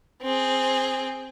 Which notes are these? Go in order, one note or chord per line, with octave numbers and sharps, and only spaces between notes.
C4 G#4